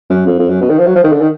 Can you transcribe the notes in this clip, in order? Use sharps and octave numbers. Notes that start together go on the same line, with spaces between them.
F#2
F2
F2
F#2
B2
D#3
F3
F#3
F3
D#3
D3
D#3